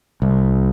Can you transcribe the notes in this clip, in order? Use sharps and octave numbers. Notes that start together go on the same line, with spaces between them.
C2